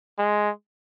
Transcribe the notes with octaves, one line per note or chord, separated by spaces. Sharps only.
G#3